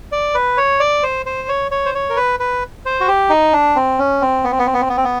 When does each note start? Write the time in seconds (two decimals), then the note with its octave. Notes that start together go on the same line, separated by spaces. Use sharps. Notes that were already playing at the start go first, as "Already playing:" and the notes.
0.12 D5
0.35 B4
0.57 C#5
0.80 D5
1.03 C5
1.26 C5
1.49 C#5
1.71 C#5
1.86 C5
1.94 C#5
2.10 A#4
2.16 B4
2.40 B4
2.85 C5
3.01 F#4
3.08 G4
3.30 D#4
3.53 D4
3.76 C4
3.99 C#4
4.22 C4
4.44 B3
4.51 C4
4.59 B3
4.67 C4
4.74 B3
4.81 C4
4.89 B3
4.97 C4
5.04 B3